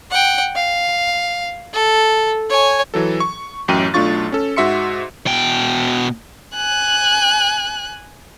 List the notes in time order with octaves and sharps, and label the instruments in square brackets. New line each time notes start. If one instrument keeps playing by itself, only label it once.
[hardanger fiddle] F#5 G5
F5
A4
C#5 G#5
[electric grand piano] E3 F#3 A4
C#6
A1 F#2 G5 D#7
B1 A3 D4 F4 C#6 A6
C#4 A4
G#2 F#4 E5 C6 C#7
[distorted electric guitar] B2 G5
[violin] G#5 F#6